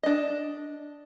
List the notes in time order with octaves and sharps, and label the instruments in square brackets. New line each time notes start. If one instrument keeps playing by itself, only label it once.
[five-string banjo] D4 D#5